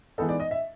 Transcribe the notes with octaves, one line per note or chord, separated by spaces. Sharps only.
E3 G#3 B3 D#4 A4
D5
D#5
E5